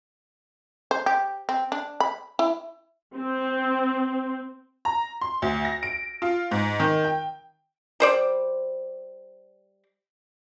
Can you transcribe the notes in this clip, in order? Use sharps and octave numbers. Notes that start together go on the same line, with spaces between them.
C5
G4
C4
D4
B5
E4
C4
A#5
C6
D2
A#6
D7
F4
G#2
D#3
G5
G3 C5 D5